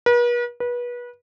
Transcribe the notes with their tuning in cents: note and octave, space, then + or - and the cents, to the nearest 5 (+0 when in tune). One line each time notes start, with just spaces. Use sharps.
B4 -45
B4 -30